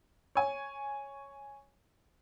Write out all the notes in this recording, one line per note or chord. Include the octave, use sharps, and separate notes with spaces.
C#5 G#5